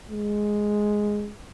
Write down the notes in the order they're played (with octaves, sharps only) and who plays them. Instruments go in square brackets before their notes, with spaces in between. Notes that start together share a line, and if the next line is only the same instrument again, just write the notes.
[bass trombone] G#3